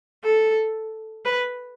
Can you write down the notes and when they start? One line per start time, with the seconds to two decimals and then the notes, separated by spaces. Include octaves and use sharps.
0.24 A4
1.25 B4